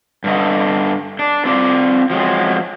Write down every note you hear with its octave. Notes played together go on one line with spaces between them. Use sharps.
G2 D3 D#5
D4
C4 F4 D5
F3 F#3 G#3 C4